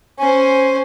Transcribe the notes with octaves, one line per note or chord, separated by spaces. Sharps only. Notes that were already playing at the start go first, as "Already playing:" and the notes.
C#4 C5 G#5